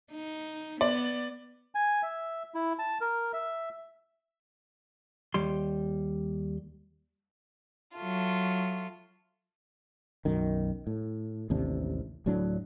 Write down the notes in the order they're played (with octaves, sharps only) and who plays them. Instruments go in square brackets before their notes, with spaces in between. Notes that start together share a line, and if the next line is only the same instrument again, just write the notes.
[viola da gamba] D#4
[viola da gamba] B3 [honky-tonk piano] D5
[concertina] G#5
E5
E4
A5
A#4
E5
[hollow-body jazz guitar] D#2 G3 C6
[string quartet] F#3 A3 F4
[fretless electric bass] B1 F#2 D#3
A2
A1 D#2 C3 D4
D1 A2 F#3 D4